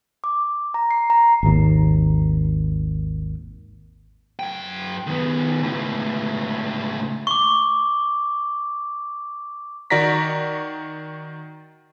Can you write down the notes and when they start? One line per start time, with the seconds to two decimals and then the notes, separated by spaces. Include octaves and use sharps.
0.24 D6
0.74 A#5
0.91 C7
1.10 A#5
1.43 G#1 D#2
4.39 F#2 G5
5.07 D#3 B3
5.63 C#2 A2
7.27 C#6 D6
9.90 D#3 F#4 D5 A#5 A#6 B6